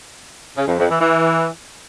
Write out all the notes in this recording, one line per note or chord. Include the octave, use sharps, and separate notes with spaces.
C#3
F2
F2
E3
E3